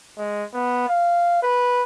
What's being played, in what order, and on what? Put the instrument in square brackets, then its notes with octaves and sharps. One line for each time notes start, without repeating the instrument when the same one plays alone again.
[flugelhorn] G#3
B3
F5
B4